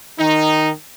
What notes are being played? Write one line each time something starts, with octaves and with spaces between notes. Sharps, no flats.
D#3 D#4